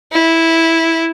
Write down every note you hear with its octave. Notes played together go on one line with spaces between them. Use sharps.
E4